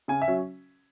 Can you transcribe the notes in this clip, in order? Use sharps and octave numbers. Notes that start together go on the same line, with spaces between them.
C#3 G#5
E5
F#3 C#4